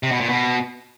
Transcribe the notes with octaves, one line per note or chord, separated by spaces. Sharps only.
C3
B2
A#2
B2